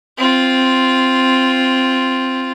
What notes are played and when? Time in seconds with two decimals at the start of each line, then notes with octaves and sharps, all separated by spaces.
0.18 C4 F4